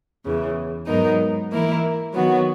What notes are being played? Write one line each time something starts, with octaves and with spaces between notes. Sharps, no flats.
E2 C#3 E3
G#2 F#3 B3 D#4 A#4
E3 A#3 E4 A#4
D#3 F#3 B3 F#4